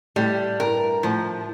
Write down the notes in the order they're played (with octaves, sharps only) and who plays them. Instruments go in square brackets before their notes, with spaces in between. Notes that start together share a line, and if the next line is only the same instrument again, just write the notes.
[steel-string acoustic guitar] A2 [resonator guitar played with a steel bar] G3
[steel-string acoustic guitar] G2 [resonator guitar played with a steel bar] A#4
[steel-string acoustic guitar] A2 [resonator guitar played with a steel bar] F3